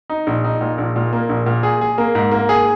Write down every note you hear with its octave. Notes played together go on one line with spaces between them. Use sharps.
D#4
A#1
D#4
A#2
A#1
A#2
A#3
A#1
A#2
G#4
G#4
A#3
G#2
A#3
G#4